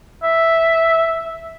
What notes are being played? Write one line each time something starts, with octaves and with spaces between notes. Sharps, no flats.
E5